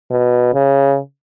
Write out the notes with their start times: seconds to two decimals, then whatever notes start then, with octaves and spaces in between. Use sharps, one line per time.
0.11 B2
0.54 C#3